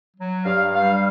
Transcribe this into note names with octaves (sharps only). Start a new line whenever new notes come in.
F#3
G2 F5
G3 F5